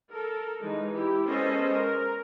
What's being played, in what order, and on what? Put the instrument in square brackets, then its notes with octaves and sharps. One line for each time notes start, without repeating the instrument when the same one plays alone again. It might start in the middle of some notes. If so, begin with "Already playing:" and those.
[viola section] A4 A#4
E3 G#3 D#4
E4 G4
G#3 B3 C#4 A4 C5 D#5
A#4